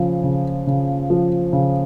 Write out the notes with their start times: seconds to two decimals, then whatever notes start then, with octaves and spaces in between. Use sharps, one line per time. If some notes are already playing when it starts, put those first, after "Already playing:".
Already playing: C#3 F3
0.24 C#3
0.67 C#3
1.10 F3
1.53 C#3